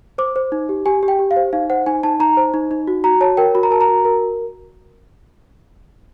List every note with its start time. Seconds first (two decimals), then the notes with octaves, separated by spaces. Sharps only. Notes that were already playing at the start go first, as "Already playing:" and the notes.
0.18 C5 D6
0.36 C5
0.52 D#4
0.69 G4
0.86 G4 G#5
1.03 G4
1.08 G5
1.19 G4
1.31 F5
1.36 C5
1.53 D#4 F5
1.70 C5 F#5
1.86 D#4 G#5
2.03 D#4 A5
2.20 D#4 A#5
2.37 C5
2.54 D#4
2.71 D#4
2.87 F#4
3.04 F#4 A#5
3.21 C#5 A5
3.37 A#4 G5
3.55 F#4 B5
3.63 A#5
3.71 A#4 A5
3.81 A#5
3.88 F#4
4.05 A#4